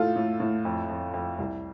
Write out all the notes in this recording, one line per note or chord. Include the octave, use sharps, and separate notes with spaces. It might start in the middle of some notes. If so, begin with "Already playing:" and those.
Already playing: A2 F4 A4
A2
A2
F2
F2
F2
C2